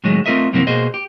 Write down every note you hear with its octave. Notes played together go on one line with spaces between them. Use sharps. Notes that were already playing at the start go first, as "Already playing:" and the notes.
A2 D#3 F#3 G#3 A3
A3 C4 F4 A#4 D#5 E5
F#2 C3 E3 F3 A#3 C4
B2 A#3 G#4 C5 D#5
G4